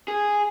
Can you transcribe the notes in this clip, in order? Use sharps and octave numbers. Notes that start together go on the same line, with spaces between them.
G#4